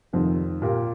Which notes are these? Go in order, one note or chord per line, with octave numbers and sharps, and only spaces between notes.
F1 F2 D#3 C4
A#2 A#3 G4 A#4